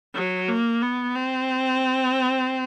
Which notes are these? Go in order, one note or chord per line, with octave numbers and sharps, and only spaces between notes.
F#3
A#3
B3
C4